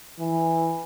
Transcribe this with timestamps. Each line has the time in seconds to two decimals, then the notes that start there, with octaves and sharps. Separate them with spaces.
0.19 E3